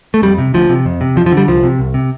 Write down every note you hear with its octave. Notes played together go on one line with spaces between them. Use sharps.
A3
F2 G3
C3
D2 F3
C3
F2
C3
F2 F3
F3
D3
G3
C2 F3
C3
C2
C3